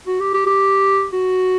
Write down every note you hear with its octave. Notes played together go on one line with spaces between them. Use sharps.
F#4
G4
G4
G4
F#4